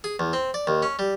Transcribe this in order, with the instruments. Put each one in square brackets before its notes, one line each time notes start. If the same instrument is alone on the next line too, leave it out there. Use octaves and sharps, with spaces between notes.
[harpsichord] G#4
E2
C4
D5
D#2
C#4
G3